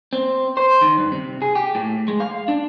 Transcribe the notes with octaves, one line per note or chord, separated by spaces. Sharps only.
C4
C5
D#3
G2
C3
G#4
G4
A2
G#3
F5
D4